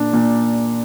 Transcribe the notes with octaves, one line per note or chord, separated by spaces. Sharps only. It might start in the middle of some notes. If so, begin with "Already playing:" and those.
Already playing: A#2 D4
A#2